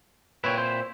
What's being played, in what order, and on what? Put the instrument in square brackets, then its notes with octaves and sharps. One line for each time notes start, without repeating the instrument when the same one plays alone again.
[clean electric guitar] A#2 C4 E4 [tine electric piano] B4 C#5 G5
[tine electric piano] C5